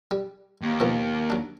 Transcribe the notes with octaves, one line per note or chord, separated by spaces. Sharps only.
G3
D#2
B2 D#3 F3
F#3 D4